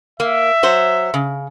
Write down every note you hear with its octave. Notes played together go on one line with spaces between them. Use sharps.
A#3 E5
F#3 C5
C#3